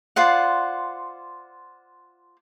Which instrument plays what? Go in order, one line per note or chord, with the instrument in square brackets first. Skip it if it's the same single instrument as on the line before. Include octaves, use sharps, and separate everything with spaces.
[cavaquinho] F4 C5 D5 F#5